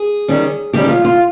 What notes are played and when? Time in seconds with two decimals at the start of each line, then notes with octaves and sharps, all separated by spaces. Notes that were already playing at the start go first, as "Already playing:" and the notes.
Already playing: G#4
0.28 D#3 G3 C#4
0.73 D#3 G3 C#4 G4
0.84 G4
0.89 F4
1.05 F4